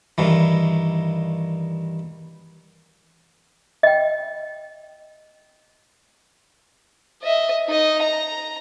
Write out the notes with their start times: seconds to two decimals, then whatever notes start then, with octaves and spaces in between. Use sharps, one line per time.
0.18 G2 D#3 E3
3.83 D#5 G5
7.23 D#5 E5
7.68 D#4 D#5
8.02 A#5